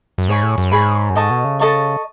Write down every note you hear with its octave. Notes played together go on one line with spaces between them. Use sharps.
F#2
G#2 G#4 C#5 G#5 B5
A2
F#2
G#2 G#4 C#5 G#5 B5
F#2
G#2 A4 D#5 A5 C#6
B2
C#3
A4 D#5 A5 C#6